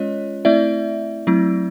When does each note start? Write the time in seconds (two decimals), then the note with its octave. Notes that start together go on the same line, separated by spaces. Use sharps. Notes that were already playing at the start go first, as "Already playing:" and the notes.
Already playing: G#3 C#4 F4 C#5 D#5
0.45 A3 C4 E4 D5 E5
1.27 F#3 A3 C4 E4